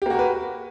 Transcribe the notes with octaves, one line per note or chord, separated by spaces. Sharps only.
A#3 F#4 G4 A#4 B4